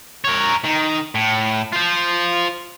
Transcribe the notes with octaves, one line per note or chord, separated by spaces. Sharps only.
A#4 C#5
D#3
A2
F4 C5